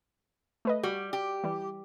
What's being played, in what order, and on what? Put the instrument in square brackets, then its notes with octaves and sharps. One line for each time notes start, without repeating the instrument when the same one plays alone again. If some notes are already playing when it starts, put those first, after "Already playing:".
[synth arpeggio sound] A3 B4 D#5
[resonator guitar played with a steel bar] G3 [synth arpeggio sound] F#4
[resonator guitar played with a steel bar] G4
[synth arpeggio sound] E3 G3